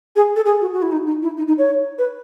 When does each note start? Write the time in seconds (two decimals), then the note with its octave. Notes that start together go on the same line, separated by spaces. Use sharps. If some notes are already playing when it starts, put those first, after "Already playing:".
0.16 G#4
0.36 A4
0.46 G#4
0.61 F#4
0.73 F#4
0.82 E4
0.92 D#4
1.07 D#4
1.22 E4
1.37 D#4
1.48 D#4
1.58 C#5
1.98 B4